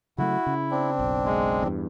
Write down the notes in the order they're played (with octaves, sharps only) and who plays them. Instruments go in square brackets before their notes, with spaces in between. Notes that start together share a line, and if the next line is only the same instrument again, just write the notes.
[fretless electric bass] C#3 F#3 A3 [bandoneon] E4 [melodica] F#4
[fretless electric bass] C#3
[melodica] C4 D4
[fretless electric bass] F#1 B1
[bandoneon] G#3
[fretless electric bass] E2 G2